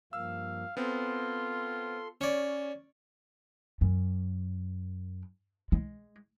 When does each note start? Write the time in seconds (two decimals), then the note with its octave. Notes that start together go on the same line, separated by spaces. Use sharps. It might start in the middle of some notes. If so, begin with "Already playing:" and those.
0.13 G2 F3 A#3 F5 E6
0.77 B3 C4 F4 A4 C6
2.21 C#4 C#5 D5
3.81 F#2
5.72 G#3